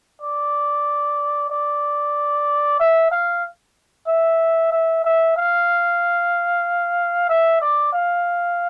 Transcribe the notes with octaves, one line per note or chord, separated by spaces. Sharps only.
D5
D5
E5
F5
E5
E5
E5
F5
E5
D5
F5